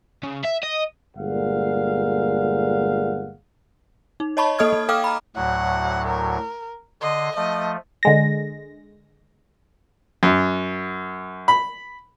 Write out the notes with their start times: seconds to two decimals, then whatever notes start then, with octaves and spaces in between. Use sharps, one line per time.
0.23 C#3
0.44 E5
0.63 D#5
1.16 G1 A#2 G#3 F5 F#5
4.20 D#4
4.37 C#5 D#5 A5 B5 C#6
4.58 A#3 A4 D#5 D#6 F6 G#6
4.73 A#3
4.89 A4 F5 G5 D6 D#6 F6
5.04 A#5 B5
5.36 D2 A2 F#3 F#5
6.07 A#4
7.02 D3 D#5 C6
7.36 F3 A3 D#5
8.03 D3 G#3 A#6
10.23 F#2
11.48 B5